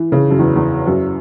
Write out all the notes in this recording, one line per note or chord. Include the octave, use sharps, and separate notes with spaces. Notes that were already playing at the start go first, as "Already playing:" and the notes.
Already playing: E3
C#3
F#2
E2
E2
F#2